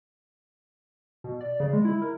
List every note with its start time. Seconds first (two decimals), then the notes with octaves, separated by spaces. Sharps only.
1.24 B2
1.41 D5
1.60 C#3
1.73 G#3
1.85 E4
2.02 A#4